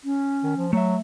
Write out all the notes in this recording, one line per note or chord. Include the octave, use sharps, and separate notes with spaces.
C#4
D#3
F3
F#3 A3 E5